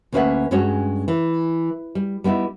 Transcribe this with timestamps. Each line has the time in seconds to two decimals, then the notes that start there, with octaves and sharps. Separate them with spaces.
0.12 D2 A#3 C#4 B4 E5 F#5
0.51 G2 G3 G#3 C#4 F#4 C#5
1.08 E3
1.95 G3
2.24 G3 B3 D#4 E4